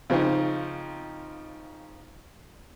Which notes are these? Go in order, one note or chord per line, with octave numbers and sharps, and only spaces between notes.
C#3 F3 C4 D#4